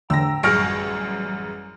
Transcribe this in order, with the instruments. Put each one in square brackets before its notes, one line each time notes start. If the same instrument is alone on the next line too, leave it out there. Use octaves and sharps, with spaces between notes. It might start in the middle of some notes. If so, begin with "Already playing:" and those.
[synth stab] E2 A2 D3 [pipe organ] G5 A#5 [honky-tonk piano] E6 A#6
[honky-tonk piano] A1 F#2 G#4 [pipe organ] G3 [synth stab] C#6 [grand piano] F6 A#6 D7